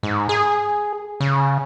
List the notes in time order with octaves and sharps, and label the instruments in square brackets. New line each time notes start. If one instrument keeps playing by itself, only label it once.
[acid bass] G#2
G#4
C#3